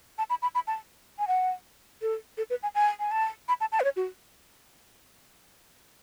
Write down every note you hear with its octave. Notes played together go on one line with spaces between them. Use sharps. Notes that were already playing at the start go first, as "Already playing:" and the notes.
A5
B5
B5
B5
A5
G#5
F#5
A4
A4
B4
G#5
G#5
G#5
A5
B5
A5
A5
B4
C#5
F#4